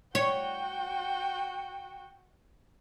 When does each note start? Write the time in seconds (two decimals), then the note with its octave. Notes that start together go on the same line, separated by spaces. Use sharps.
0.15 F#4 C#5 G5